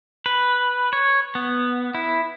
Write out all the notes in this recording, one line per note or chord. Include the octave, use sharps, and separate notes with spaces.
B4
C#5
B3
E4